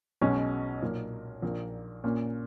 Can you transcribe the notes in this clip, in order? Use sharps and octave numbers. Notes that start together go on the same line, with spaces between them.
B1 B2 G#3 C#4
B1 A#2 A#3
A#1 A#2 A#3
A#2 A#3 C#4